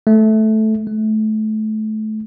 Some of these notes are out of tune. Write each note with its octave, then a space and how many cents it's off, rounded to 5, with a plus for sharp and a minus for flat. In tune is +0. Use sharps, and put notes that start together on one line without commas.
A3 -10
A3 -25